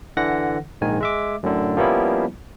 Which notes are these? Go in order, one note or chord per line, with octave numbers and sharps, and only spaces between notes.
D3 E3 F#5 A#6
A#1 G#2 D#3 G#5
G#3 E5 D6
F#2 A2 D3
F3 G3 A#3 B3 C#4 E4